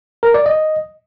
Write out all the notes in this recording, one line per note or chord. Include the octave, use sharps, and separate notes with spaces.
A#4
D5
D#5